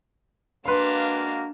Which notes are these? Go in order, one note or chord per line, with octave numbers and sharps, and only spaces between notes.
G#3 A#3 D4 F#4 B4 F5 C6